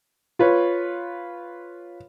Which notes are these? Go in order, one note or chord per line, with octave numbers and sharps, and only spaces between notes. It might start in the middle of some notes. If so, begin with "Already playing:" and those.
F4 B4 C#5